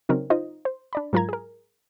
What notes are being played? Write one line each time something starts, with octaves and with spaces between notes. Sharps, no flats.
C#3 F#3 C4 C#4 D#4 A#4
D#4 F4 C5 D#5
C5
D4 D5 B5
G#2 F#3 F4 A#4 A#5 G#6
G#4 A#4